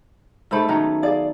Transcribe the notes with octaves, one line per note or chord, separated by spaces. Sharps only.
G#2 A3 A4 C5 B5
D#3 F#3 B3 C#4 A#5
G#4 D5 F5